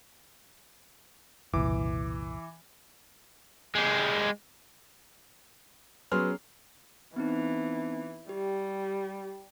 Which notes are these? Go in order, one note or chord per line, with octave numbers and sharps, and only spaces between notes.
F#1 C2 A#2 E3 D6
G#3 G4
F#3 B3 C#4 G#4 C6 F6
E3 B3 C4 D#4
G3 G4